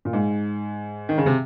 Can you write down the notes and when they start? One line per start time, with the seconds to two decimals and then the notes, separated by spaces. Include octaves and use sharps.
0.05 A#2
0.13 G#2
1.09 D#3
1.18 C#3
1.26 C3